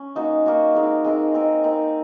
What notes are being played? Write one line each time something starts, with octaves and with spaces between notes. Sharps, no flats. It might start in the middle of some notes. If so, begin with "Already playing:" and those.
Already playing: C#4
A#3 D#4 F#4 C#5
A#3 D#4 F#4 C#5
G#3 C4 D#4 A#4
G#3 C4 D#4 A#4
C4 D#4 A#4 D#5
C4 D#4 A#4 D#5